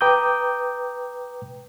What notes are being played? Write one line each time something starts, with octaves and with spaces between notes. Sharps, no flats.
B4 G5 A#5 D6 D#6 G6